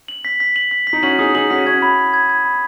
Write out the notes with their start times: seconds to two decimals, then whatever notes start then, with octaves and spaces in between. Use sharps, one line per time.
0.08 F#7
0.25 B6
0.40 B6
0.56 F#7
0.71 B6
0.87 B6
0.93 D#4
1.03 C#4 F#4 F#7
1.19 D#4 G#4 D#6
1.34 D#4 G#4 F#7
1.50 C#4 F#4 B6
1.66 C#4 F#4 G#6
1.82 B5
1.99 B5
2.14 G#6
2.30 G#6
2.45 B5